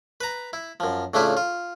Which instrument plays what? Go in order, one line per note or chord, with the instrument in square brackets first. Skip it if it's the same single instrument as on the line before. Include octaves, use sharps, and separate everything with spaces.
[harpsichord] B4 A#5
E4
F#2 F3
A2 C#3 A3 D4 E4 F4
F4